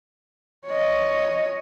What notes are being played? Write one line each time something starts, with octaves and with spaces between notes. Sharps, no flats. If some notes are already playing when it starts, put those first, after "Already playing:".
C#5 D#5